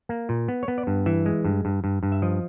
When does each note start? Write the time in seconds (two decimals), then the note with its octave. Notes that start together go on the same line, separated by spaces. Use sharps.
0.09 A#3
0.29 A#2
0.48 B3
0.63 C#5
0.68 B3
0.78 D5
0.87 G2
1.06 E3 E5
1.26 G#3
1.45 G2
1.65 G2
1.84 G2
2.03 G2
2.12 E5
2.22 F3 D#5